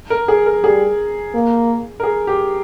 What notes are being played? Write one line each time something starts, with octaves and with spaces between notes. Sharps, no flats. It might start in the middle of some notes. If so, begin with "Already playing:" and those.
A#4
G#4
A#4
G3 G#4
A#3
A#4
G#4
G4